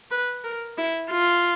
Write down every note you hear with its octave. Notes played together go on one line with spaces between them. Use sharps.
B4
A#4
E4
F4